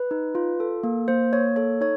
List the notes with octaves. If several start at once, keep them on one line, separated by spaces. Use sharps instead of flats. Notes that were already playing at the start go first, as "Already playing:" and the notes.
Already playing: B4
D#4
F4
A4
A#3
A#3 C5
A#3 C#5
A4 C#5
D#4 C#5